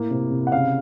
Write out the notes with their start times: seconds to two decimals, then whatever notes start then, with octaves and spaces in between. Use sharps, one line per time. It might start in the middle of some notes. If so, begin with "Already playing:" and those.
Already playing: A2 A#3
0.10 C3
0.31 C3
0.47 F#5
0.52 C#3 F5